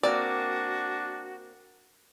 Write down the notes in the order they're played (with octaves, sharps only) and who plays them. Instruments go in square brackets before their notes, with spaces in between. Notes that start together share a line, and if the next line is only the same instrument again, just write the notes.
[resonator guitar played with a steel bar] A#3 C4 [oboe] D4 [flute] F#4 [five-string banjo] D5